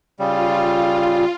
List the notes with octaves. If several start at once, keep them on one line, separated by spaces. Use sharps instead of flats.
C#3 G3 F4